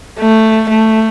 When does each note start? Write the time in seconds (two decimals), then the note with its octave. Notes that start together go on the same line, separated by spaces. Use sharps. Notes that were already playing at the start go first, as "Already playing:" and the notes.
0.19 A3
0.69 A3